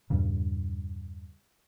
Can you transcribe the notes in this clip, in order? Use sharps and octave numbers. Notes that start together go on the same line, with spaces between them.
E2 G2 A#2 C#3